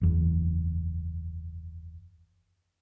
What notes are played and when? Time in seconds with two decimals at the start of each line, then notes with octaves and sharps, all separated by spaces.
0.01 F#1 E2